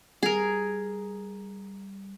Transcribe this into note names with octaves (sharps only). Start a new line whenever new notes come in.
G3 G#4 A#4